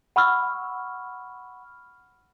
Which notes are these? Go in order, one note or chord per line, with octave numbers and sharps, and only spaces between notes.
F#5 B5 C#6 E6 F6